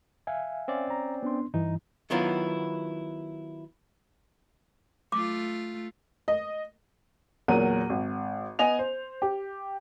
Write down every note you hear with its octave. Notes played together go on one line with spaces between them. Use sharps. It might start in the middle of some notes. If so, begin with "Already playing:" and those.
E5 F5 G#5
C4 C#4 D5
A#5
B3 D4 C6
G2 E3 D#4
D#3 F#3 B3 E4 F4
A3 F4 D6
D#5
E2 A#2 F#3 A#4 F#5 D#7
G#1
B3 D#5 G#5 F7
C5
G4